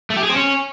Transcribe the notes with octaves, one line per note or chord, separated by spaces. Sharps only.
A3
G4
G#4
C4
C#4